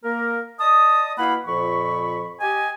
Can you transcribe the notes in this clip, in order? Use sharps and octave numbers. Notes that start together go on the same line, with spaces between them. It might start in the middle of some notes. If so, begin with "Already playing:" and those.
A#3 A#4
D5 D#5 A5 D#6
B2 A#3 E4 F5 F#5 B5
F2 A#2 F3 B5 C#6
G4 D#5 G#5